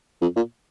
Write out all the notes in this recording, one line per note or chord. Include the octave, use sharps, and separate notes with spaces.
F2
A#2